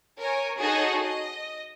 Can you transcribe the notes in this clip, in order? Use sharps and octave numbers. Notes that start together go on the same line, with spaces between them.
A#4 C#5 G#5
D#4 F#4 G#4 A4 C#5 D#5
D#5